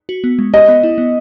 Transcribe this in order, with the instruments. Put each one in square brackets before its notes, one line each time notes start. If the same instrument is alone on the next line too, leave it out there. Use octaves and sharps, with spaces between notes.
[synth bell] F#4
B3
G#3
[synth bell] G4 [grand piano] D#5
[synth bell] B3
E4
B3